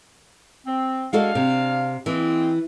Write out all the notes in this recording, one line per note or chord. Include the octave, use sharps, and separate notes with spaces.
C4
G#3 D4 F#4 A4 F5
C3
E3 G#3 A#3 C4